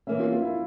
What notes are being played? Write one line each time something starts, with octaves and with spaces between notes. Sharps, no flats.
E3 A#3 C#4 E5
F4
F4
E4